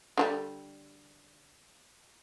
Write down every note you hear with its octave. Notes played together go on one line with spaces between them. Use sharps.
D3 F3 G3